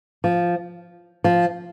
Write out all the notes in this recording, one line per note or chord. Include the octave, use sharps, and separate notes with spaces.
F3
F3